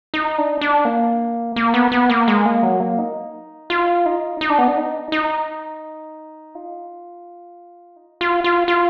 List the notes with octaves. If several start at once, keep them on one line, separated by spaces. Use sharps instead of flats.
D#4
D4
D4
A#3
A#3
B3
B3
A#3
G#3
A#3
F#3
A#3
D#4
F4
D#4
D#4
D4
B3
D4
D#4
D#4
F4
D#4
F4
F4
F4